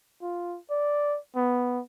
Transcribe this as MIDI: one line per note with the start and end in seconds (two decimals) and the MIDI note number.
0.22 0.58 65
0.70 1.19 74
1.36 1.81 59